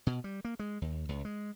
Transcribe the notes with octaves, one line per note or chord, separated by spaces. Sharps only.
B2
G3
A#3
G#3
D#2
C#2
G#3